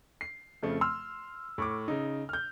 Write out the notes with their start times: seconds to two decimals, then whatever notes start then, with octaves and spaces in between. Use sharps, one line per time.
0.21 C7
0.62 F2 C#3 F3 A3
0.81 C6 E6 F6
1.58 A2 C#6 D6
1.88 C#3 D#4
2.29 F6 G6